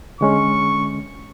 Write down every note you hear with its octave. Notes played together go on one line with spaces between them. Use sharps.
D3 G#3 C#4 C#6